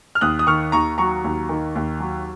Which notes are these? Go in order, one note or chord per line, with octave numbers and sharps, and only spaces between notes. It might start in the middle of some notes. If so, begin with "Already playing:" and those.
F6
D#2 D#6 F#6
D#6
D#3 C#6 F6
D#2 A#5 C#6
F#3 A#5 C#6
D#2
D#3
D#2
F#3